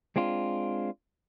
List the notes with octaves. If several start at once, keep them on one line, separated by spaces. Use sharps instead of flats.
G#3 C4 D4 F4